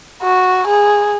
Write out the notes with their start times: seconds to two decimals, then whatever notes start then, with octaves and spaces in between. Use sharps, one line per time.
0.22 F#4
0.67 G#4